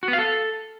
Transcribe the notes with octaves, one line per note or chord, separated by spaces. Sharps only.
F#4
B3
F5
A4